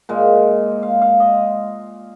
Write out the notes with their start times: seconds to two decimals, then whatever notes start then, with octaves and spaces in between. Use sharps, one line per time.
0.09 A#2 G#3
0.83 F5
1.02 F5
1.20 D#5